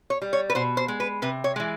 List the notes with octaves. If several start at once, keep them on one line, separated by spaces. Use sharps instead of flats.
C#5
G3
C#5
B4
B2 C5
C5
G#3
B4
C3 B4
C#5
E3 G#3